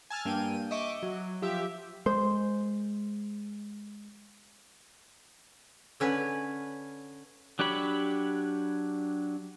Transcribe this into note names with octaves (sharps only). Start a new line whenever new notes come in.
G#5 A5 E6 F6
G2 A#3 G5 D#7
D#5 E5 C#6 D6
F#3
F3 G4 E5
G#3 C5
D3 C#4 B4
F#3 D4 G4 C#5 B5